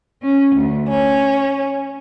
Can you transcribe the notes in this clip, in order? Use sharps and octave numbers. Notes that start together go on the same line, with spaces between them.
C#4
D2
C#4